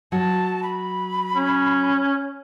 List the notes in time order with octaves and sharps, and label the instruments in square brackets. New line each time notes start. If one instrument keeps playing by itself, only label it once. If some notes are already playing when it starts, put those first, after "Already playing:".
[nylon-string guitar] F#3 [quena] A5
[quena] B5
[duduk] C#4